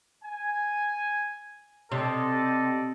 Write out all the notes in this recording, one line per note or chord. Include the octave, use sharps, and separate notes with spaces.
G#5
C3 A4 D5 D#5